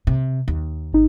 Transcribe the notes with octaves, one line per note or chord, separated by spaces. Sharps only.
C3
D#2
G#1 D#4